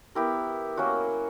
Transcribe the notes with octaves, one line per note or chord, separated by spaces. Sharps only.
B3 E4 G4 A#4
F#3 A#3 C#4 F#4